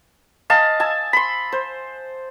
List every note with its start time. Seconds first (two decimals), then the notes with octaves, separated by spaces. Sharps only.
0.50 D#5 F5 G#5 A5
0.80 G#5 A5 E6
1.13 B5 C6
1.52 C5